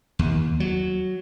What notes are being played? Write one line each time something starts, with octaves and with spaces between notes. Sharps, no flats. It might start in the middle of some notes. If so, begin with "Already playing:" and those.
D#2
F#3